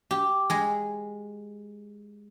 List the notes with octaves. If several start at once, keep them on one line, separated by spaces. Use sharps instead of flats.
G4
G#3 G#4